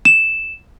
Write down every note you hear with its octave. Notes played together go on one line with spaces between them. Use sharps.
E7